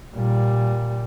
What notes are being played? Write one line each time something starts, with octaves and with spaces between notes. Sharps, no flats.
A#2 G3